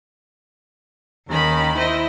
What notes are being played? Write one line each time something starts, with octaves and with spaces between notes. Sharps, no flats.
D#2 D#3 C#4 B5
E4 C5 D#5